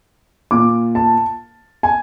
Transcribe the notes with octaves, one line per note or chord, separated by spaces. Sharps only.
A#2 D6
A5
G#5